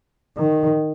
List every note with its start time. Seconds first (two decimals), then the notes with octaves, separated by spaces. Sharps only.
0.37 D#3